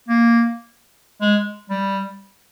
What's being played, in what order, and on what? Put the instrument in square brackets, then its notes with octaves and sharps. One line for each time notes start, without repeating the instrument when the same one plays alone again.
[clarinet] A#3
G#3
G3